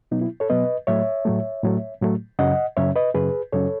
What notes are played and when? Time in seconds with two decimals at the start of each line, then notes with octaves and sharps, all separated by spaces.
0.11 B2 F#3 B3 D#4
0.21 E4
0.40 A4 C#5
0.50 B2 F#3 B3 B4 D#5
0.87 A2 F#3 A3 C#5 E5
1.25 A2 F#3 A3
1.64 A2 F#3 A3
2.02 A2 F#3 A3
2.39 F#2 C#3 F#3 C#4 D#5 F#5
2.77 F#2 C#3 F#3 C#4 C#5 E5
2.96 B4 D#5
3.14 F#2 C#3 F#3 C#4 G#4 B4
3.53 F#2 C#3 F#3 C#4 A4 C#5